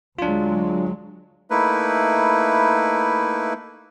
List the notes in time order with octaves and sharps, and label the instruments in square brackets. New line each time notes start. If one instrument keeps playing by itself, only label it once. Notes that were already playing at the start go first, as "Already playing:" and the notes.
[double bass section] D2 F#3 G#3 [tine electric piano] D4 F4
[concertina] A3 A#3 D#4 E4 B4